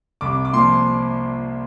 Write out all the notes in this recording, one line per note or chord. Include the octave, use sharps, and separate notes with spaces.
C2 D6
D6
A#2 F3 C6